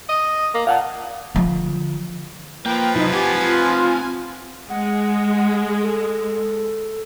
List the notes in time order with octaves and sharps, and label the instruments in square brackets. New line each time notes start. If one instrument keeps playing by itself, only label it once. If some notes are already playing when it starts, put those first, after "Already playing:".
[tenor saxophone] D#5
A#3
[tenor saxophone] A#2 [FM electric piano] F5 F#5 A5
[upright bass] D3 F3
[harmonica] F3 B4 [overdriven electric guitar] A#3 [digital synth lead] G5
[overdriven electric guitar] C3 F#3 [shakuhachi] D#4 [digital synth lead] E4
[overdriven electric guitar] C4 F#5 [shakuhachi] G4 [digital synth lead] G#5
[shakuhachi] F4
[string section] G#3 [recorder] F#5
[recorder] A4